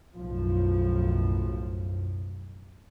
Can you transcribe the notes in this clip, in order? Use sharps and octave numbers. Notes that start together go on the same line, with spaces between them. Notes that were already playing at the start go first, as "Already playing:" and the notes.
B1 F#2 A2 F3